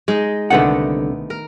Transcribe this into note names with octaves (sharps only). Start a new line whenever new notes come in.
G#3 D#4 D#5
C2 D3 D#3 A3 B3 F#5
A#4